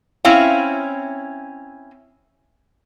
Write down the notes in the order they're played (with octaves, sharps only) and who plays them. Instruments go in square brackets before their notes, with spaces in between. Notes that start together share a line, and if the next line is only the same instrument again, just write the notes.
[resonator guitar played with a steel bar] C4 C#4 E4 F5